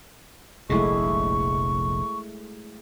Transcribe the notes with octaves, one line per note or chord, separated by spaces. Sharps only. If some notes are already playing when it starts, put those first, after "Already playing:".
F1 A#1 C3 G#3 A3 E4 C#6